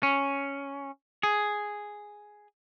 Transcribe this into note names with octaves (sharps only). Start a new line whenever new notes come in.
C#4
G#4